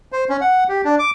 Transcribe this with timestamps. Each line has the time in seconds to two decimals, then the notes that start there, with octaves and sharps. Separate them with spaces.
0.12 C5
0.30 C#4
0.41 F#5
0.69 G4
0.85 D4
0.99 D6